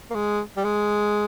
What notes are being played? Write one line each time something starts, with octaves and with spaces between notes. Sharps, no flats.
A#3
G#3
G3
G#3